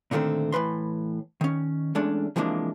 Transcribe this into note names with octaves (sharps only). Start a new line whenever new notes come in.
A#2 D3 D#3 A3 C4
A2 E3 B4 C6
D#3 C#4
E2 G#3 A3 C#4 D4
C3 E3 F3 G#3 A#3 D4